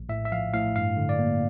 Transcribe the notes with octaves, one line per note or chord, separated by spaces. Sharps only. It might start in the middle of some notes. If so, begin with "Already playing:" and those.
Already playing: A#1
A2 E5
E5
F3 F5
A2 F5
G2 F5
D3
D5
A#3